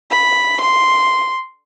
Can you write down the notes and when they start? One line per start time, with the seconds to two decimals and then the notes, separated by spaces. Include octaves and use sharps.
0.11 B5
0.61 C6